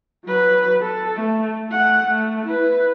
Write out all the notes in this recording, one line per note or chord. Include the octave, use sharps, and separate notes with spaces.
F#3 B4
A4
A3
A3 F#5
A3
E4 B4